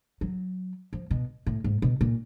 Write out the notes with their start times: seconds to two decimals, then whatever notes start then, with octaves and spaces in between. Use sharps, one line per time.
0.21 F#3
0.93 F3
1.11 B2
1.46 A2
1.64 G#2
1.82 B2
2.01 A#2